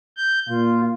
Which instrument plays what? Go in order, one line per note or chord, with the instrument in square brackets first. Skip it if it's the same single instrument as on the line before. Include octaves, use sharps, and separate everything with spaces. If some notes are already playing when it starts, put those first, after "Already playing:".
[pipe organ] G6
[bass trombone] A#2 [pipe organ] F4